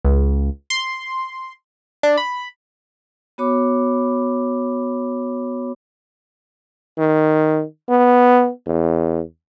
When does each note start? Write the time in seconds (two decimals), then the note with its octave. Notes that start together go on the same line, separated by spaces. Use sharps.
0.05 C#2
0.70 C6
2.03 D4
2.18 B5
3.38 B3 F#4 C#5 B5 D6
6.98 D#3
7.89 B3
8.66 E2